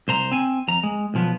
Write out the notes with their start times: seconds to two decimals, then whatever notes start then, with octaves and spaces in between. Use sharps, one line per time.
0.08 C2 C5 A#5
0.32 C4 G#5
0.68 F2 A#5
0.83 G#3
1.14 B1 F3 B3